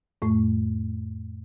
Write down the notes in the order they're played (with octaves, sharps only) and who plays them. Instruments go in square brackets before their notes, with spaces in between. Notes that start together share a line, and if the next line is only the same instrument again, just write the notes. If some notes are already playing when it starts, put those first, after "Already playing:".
[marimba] F2 A2 A3